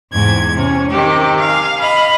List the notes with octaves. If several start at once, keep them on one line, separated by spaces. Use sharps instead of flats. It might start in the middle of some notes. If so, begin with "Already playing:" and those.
E2 G#2 C3 G#6
C3 C#4
C3 D#3 G4
F5 G#5
D#5 F5 B5